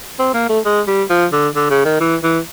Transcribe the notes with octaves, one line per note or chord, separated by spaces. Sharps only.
C4
A#3
A3
G#3
G3
F3
D3
D3
C#3
D#3
E3
E3